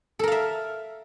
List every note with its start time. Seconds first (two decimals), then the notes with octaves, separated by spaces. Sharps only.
0.19 A4
0.24 A#4
0.28 F5
0.32 E5